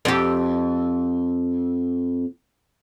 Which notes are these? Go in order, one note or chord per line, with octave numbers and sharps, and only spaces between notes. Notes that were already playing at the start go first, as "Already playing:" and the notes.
F2 G4